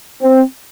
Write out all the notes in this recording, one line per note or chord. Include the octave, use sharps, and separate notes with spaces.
C4